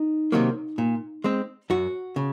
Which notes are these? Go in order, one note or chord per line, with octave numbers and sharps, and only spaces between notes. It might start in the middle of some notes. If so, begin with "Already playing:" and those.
Already playing: D#4
C3 D#3 F#3 A#3
A#2
G#3 C4
F#2 F#4
C#3